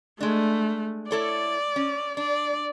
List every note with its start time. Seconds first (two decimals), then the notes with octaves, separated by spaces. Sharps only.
0.20 G#3 A3 D4
1.11 E4 A4 C#5 D5
1.76 C#4
2.17 D4 D5